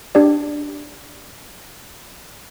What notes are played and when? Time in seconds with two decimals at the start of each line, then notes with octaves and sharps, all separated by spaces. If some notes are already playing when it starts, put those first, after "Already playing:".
0.15 D4 G4 D5